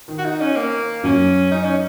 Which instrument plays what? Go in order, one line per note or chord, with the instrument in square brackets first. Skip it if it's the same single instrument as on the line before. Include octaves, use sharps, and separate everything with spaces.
[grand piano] D#3
[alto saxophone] F#4
D#4
C#4
A#3
[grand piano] F#2 F#3 [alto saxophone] C#4
[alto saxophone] D#4
C#4